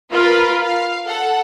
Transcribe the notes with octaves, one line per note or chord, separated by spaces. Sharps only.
F4 A#4 B4 F5 B5
F5
A4 F#5